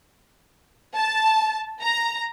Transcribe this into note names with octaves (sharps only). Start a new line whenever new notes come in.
A5
A#5